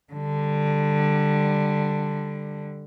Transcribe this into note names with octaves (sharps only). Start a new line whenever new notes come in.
D3 G3